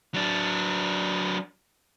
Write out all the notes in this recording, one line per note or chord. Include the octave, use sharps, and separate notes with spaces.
F#3 D4